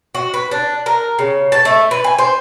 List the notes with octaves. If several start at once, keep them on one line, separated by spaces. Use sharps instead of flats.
F#4
B4
D4
A#4
C#3
A5
A3
B4
G#5
C5